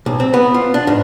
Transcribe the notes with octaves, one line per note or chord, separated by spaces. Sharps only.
B1
C4
B3
F4
D4
G#2